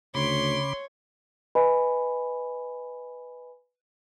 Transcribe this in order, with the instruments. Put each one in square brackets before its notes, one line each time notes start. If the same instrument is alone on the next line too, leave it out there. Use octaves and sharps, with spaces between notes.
[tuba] D2 [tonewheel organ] C#3 B5 D6 [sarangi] C#5 [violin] C6
[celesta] B4 D#5 G#5 B5